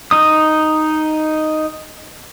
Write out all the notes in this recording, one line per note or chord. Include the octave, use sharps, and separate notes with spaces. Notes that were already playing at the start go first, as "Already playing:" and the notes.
D#4 D#6